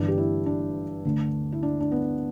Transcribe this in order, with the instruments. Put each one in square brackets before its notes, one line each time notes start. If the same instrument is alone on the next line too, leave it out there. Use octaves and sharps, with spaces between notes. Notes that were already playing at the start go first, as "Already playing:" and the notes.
Already playing: [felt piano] G1 G2 E3 D4
G4
E4
D4
D2 D3
E4
D4
D4
B3